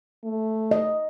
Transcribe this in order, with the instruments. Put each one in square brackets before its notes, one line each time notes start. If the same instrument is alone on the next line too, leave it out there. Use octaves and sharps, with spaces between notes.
[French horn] A3
[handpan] D#5